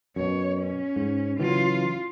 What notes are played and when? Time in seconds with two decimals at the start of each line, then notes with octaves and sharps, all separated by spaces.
0.16 F#2 B2 C#5
0.62 C#4
0.96 G#2
1.39 C#3 E3 F#3 F4